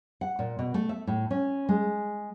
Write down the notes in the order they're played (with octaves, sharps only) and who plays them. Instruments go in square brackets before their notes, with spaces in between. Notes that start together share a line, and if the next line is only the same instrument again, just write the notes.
[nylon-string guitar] F#5
A#2
B2
A3
E5
A2
C#4
G#3